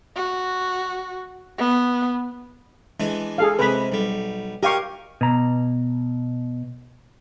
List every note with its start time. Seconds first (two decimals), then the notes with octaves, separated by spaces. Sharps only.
0.16 F#4
1.58 B3
3.00 E3 G#3 D4
3.38 G#4 A4 F5
3.59 C3 G#3 B4 B5
3.92 B1 G3
4.63 G4 A#4 D#5 F5 G#5 C#6
5.21 B2 A#5